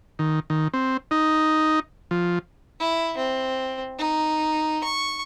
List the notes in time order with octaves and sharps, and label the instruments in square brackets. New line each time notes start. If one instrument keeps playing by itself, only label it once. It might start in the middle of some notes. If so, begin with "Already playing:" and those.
[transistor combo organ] D#3
D#3
C4
D#4
F3
[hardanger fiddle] E4
C4
D#4
C#6